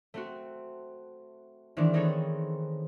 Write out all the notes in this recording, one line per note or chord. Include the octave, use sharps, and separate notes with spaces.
A3 C4 F#4
D#3 E3 G#3 C4 D4
B3 C4 D#4 G#4 A4 C#5